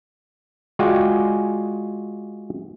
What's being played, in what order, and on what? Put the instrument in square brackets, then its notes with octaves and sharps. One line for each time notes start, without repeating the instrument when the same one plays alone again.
[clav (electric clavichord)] G#3 F4 F#4 D5 G5 G#5